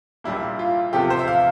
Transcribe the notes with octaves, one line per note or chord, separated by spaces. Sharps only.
A#1 A#2 G3 A#3 E4
F4
E2 C3 F3 A3 G4
C5
E5
F5